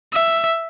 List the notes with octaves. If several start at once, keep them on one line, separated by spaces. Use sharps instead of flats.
E5